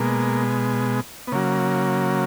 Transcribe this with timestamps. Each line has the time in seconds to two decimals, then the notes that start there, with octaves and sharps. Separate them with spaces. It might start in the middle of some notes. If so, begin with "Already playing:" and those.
Already playing: B2 G#3 A#3
1.28 B3
1.32 C#3 F#3 A#3